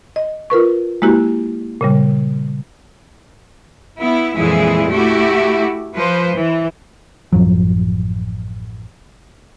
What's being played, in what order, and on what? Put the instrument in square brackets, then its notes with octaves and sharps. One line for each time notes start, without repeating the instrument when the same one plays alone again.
[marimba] D#5
F4 A#4 B4 C#6
G#3 A#3 E4 F#4 G4
A#2 C#3 G3
[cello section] B3 E4
F2 A#2 E3 G#3 E4 G#4
A3 E4 F#4 G4
F3 B4 C5
E3
[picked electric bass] A1 F#2 F3 F#3